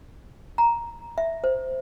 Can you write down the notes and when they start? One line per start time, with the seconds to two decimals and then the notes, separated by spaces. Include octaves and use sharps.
0.58 A#5
1.18 E5
1.44 C5